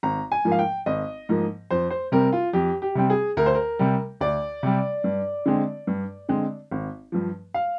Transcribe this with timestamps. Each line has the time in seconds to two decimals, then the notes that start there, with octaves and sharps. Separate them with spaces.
0.03 G#1 A#5
0.32 G#5
0.45 G#2 F3 A#3
0.52 F5
0.59 G5
0.86 G#1 D#5
1.29 G#2 F3 A#3
1.70 F2 C5
1.90 C5
2.12 C3 G3 C4 A#4
2.33 F4
2.53 F2 G4
2.82 G4
2.95 C3 G3 C4
3.10 G#4
3.37 D2 A#4
3.46 C5
3.55 A#4
3.79 C3 G3
4.21 D2 D5
4.63 C3 G3
5.04 G2
5.46 D3 G#3 C4
5.87 G2
6.29 D3 G#3 C4
6.71 G#1
7.12 G2 F3
7.54 F5